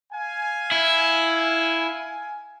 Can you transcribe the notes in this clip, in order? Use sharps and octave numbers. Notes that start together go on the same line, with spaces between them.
F5 G#5
E4